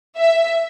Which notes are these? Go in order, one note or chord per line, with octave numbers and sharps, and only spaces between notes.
E5